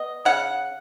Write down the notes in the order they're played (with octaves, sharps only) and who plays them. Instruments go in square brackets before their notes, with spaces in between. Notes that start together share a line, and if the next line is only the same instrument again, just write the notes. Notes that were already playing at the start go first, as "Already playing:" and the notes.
Already playing: [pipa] B3 D#5
C#3 F#5